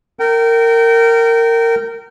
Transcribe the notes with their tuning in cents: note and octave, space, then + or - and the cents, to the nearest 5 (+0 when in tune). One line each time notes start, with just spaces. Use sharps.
A#4 -20 G5 -30